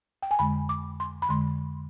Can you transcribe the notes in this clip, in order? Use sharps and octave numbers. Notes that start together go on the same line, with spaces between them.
G5
G#5
F2 D3 G#3 B5
D6
C6
B5
F2 D3 G#3 C6